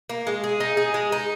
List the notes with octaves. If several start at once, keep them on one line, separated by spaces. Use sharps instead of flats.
A#3
G#3
G#4
D#4
G#4
G#3
D#4